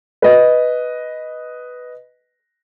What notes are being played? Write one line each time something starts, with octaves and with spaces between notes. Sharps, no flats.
B4 D#5